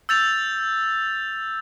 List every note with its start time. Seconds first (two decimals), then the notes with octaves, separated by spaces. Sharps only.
0.09 E6 G6 A6 F7